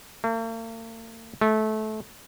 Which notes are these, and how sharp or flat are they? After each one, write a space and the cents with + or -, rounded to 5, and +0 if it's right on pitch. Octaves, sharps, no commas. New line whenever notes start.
A#3 -45
A3 -20